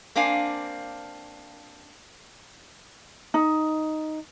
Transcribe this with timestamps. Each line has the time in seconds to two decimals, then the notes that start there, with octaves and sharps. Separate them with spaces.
0.16 A#3 C4 D4 F5 G#5
3.34 D#4